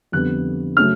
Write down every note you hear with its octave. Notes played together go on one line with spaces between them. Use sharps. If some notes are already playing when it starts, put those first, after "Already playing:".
F2 D3 G3 B3 F#6
C#3 F#3 A3 F6